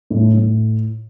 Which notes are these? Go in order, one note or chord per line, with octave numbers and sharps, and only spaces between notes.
A2
A2